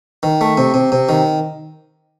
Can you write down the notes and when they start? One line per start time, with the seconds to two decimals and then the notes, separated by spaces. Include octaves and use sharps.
0.23 D#3
0.41 A3
0.57 C3
0.74 C3
0.92 C3
1.09 D#3